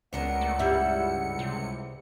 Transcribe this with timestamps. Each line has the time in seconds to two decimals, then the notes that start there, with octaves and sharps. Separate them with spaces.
0.13 C#2 B3 D4 A#4 F#5 C#7
0.41 A3
0.59 G2 G3 E4 E5
1.39 C3